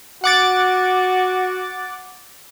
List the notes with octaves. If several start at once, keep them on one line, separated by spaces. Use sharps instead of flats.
F#4 F#5 D6 A6